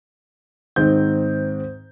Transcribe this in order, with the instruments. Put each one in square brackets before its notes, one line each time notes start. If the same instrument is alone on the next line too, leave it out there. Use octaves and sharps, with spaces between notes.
[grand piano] G#2 D#3 C4 G6